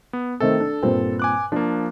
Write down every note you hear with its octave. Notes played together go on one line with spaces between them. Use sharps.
B3
D#3 A3 C4 A4
D4
G2 A#2 C4
G#5 D6 F#6
F3 A#3 D4